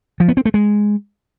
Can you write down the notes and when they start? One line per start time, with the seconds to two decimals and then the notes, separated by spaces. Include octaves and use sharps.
0.20 F3
0.29 B3
0.37 C4
0.45 A3
0.54 G#3